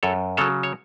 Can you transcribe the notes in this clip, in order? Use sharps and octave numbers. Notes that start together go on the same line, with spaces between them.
F#2 A4 C#5
C#3 F#3 A4 C#5
C#5